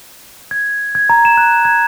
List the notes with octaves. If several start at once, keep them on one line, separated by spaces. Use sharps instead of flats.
G#6
G#6
A#5
E7
F#6
G#6